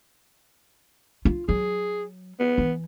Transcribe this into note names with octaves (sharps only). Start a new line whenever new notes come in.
F4
F#3 G#4
B3
E3